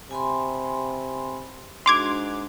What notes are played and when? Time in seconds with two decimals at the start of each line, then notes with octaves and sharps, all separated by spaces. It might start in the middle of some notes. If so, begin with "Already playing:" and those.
0.11 C3 G#5 B5 C6
1.86 G#2 D4 F#4 C6 D6 G#6